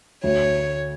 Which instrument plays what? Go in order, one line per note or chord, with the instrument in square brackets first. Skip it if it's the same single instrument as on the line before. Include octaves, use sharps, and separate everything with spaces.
[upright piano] D2 [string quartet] C#5